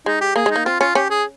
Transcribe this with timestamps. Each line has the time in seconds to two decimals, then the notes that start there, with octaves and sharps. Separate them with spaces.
0.06 G#3 D#4
0.21 G4
0.36 A#3 G#4
0.46 G#3
0.51 A#3 D#4
0.66 C4 F4
0.81 C#4 F4
0.95 C#4 G4
1.10 G#4